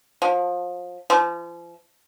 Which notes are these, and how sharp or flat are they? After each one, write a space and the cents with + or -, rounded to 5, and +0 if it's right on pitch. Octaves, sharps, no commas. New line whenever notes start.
F3 +30
F3 -35